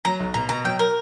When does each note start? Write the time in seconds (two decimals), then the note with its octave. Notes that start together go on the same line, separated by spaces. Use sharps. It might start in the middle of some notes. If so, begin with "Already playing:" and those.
0.05 F#3 A#5
0.20 B1
0.34 B2 A#5
0.49 B2 A#5
0.64 F#3 G5
0.79 A#4